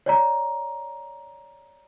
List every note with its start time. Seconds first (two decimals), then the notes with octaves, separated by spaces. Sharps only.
0.06 C#5 D5 A#5